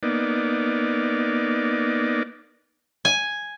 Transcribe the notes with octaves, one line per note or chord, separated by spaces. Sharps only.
A#3 B3 D#4 D5
G#5